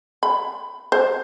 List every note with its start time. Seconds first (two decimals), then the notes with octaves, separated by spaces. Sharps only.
0.23 B5
0.92 C5